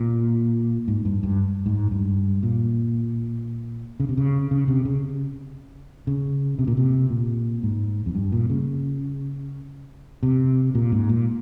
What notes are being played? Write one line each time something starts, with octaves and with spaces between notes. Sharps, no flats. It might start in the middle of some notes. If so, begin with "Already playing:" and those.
Already playing: A#2
G#2
G2
G2
G#2
G2
A#2
C#3
C3
C#3
C#3
C3
C#3
C#3
C3
A#2
C3
A#2
G#2
F2
G2
A#2
C#3
C3
A#2
G#2
A#2